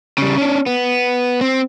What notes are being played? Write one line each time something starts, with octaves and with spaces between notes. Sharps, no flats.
C#3 G3
C#4 D4
B3
C4